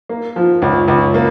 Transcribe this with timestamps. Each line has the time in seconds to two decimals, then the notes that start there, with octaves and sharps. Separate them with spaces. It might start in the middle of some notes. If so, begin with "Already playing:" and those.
0.09 A#3
0.36 F3
0.62 C#2
0.88 C#2
1.14 A#3